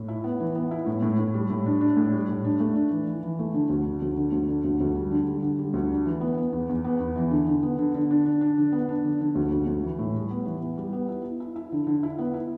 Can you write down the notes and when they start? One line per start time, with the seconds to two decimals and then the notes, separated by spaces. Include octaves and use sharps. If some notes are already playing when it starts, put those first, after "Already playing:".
Already playing: A2
0.08 E4
0.24 B3
0.40 E3
0.55 B3
0.71 E4
0.86 A2
1.03 A2
1.19 A2
1.34 G3
1.50 A2
1.66 D4
1.81 D4
1.97 A2
2.12 G3
2.29 A2
2.45 D4
2.60 A3
2.75 D4
2.91 E3
3.08 E3
3.23 E3
3.39 A3
3.54 D3
3.69 D2
3.85 D3
4.02 D2
4.17 D3
4.32 D2
4.49 D3
4.64 D2
4.80 D2
4.95 G3
5.11 D3
5.27 G3
5.42 D3
5.59 G3
5.74 D2
5.91 D4
6.06 E3
6.21 B3
6.37 B3
6.53 E2
6.69 E2
6.84 B3
7.00 E2
7.16 E3
7.31 D3
7.47 D3
7.63 B3
7.79 D3
7.94 D3
8.11 D4
8.25 D4
8.41 D4
8.58 D3
8.72 B3
8.89 D4
9.05 D3
9.21 D3
9.35 D2
9.51 D2
9.67 D2
9.84 E3
9.99 A2
10.15 G3
10.31 B3
10.46 E3
10.61 B3
10.78 G3
10.93 B3
11.09 E4
11.24 E4
11.40 E4
11.56 E4
11.72 D3
11.87 D3
12.03 E4
12.19 B3
12.34 E4